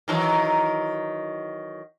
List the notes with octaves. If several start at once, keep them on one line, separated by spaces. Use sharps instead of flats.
D#3 E3 F#3